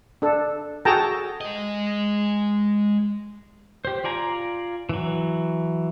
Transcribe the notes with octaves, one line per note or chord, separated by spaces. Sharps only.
D4 A4
F#4 G#4 A4 G5 A5 A#5
G#3 D#5
G4 C5
F4 D5 G#5 A#5
E3 F#3